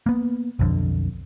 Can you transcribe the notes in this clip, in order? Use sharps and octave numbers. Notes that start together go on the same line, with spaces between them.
A#3 B3
B1 F2 D3